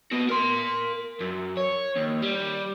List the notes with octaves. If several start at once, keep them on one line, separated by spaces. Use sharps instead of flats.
B3 F#4
A#4 C6
F#2
C#5
D#2
G3